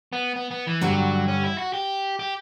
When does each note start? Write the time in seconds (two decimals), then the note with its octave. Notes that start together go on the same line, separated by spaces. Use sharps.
0.13 B3
0.36 B3
0.51 B3
0.67 E3
0.81 G2 D3 F#3 G3
1.28 C#4
1.44 E4
1.58 F#4
1.74 G4
2.19 G4